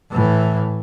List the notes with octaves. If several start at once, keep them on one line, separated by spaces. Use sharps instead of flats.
A2 E3